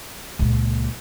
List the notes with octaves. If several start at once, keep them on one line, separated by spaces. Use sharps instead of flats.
C#2 A#2